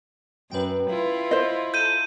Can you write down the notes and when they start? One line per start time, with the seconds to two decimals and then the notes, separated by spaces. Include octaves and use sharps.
0.51 F#2 B4 G5
0.90 E4 F4
1.31 C5 D#5
1.74 A4 A#5 G6 D#7